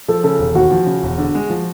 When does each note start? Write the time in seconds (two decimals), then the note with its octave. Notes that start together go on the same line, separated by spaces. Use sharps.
0.08 F3 A4
0.24 C#3 A4
0.39 E1
0.55 D#2 F#4
0.71 F3
0.86 C#3
1.03 E1
1.18 D3
1.35 G#3
1.50 F3